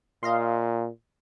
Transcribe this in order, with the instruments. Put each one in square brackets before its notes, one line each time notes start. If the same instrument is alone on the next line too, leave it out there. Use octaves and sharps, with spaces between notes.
[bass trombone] A#2 [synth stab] D#5 F5 C6